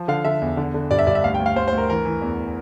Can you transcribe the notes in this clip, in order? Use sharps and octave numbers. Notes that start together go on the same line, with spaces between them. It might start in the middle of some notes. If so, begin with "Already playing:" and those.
Already playing: F3
D3 F5
D3 E5
E2
D3
D3
G2 D5
E5
G2 D5
E5
D2 F5
G5
D2
F5
D2 C5
C5
D2
A#4
E3 A#4
E3
E2